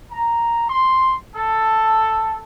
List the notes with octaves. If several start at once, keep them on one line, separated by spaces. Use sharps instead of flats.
A#5
C6
A4